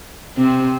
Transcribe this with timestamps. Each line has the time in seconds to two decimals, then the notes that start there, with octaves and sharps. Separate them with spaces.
0.37 C3 C4